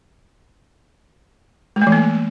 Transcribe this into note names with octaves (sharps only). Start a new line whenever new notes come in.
G#3
A3
E3
A#3